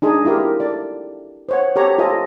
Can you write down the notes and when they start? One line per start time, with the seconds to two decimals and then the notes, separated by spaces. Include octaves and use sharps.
0.02 D4 D#4 G#4
0.25 E4 F4 G4 A#4
0.60 A4 D5
1.49 C5 C#5 F#5
1.76 G4 A4 C#5 A#5
1.98 F4 A4 C5 D#5 G#5